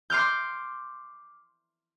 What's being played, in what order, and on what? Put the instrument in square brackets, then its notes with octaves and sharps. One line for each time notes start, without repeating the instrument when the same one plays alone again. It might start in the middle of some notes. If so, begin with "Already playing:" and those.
[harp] C6 D6 F6 G6